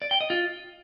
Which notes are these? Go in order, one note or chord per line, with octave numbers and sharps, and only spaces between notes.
D5
G5
D#5
F4